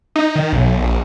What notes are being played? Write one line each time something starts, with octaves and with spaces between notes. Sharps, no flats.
D#4
D#3
B1
A#1